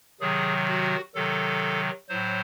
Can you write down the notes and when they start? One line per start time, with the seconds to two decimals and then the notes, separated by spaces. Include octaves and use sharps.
0.21 C3 D#3 F#3 G#4
0.68 F#4
1.15 C3 D#3 F#3 A4
2.09 A2 F#3 C5